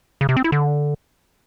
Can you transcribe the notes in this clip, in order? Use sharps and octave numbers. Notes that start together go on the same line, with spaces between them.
C#3
C3
C4
E4
D3